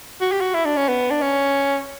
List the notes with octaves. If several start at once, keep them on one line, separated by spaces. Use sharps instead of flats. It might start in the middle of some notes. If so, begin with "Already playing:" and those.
F#4
G4
F#4
E4
D4
C#4
B3
D4
C#4